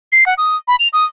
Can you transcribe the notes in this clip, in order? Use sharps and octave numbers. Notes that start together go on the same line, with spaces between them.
C7
F#5
D#6
B5
F7
D#6